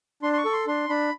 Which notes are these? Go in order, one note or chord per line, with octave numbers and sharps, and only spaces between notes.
D4 C6
C6
C#6
A4
C6
D4 C6
D4 B5